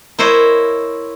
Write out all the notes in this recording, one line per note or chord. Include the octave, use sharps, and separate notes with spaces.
E4 A#4 C5 C#5 D#5